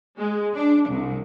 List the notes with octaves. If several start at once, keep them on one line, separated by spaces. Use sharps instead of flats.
G#3
D4
C2